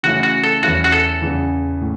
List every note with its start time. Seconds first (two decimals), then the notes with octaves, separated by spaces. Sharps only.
0.03 C#3 E3 A3 C#4 E4 F#4
0.23 F#4
0.44 A4
0.63 E2 E3 C#4 E4 F#4
0.84 F#4
0.92 A4
1.22 E2 C#3 E3
1.81 A2